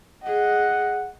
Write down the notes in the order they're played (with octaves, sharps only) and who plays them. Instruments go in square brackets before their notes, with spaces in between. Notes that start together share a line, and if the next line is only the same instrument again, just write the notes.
[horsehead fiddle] G#4 D#5 [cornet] F#5